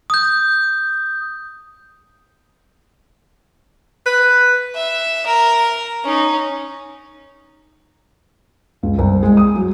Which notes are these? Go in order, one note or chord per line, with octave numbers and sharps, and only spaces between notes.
D#6 G6
B4
E5
A#4
C#4 D#4
C#2
C2
G#3
D#6
F#3